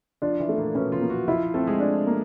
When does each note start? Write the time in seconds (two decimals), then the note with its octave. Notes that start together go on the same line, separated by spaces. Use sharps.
0.22 F3 D4 F4
0.40 E3 E4
0.49 A3
0.58 A#2 A#3
0.75 B2 B3 C#4
0.92 F3 F4
1.01 A#3
1.10 F#3 F#4
1.28 F3 E4 F4
1.54 A3 C4 A4
1.67 G#3 G#4
1.80 D4
2.07 A#3